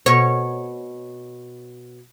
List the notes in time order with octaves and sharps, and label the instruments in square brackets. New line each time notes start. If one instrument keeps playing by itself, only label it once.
[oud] B2 C#5